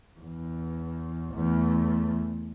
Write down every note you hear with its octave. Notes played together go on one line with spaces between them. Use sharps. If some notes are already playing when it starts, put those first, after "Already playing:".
E2
E2 A3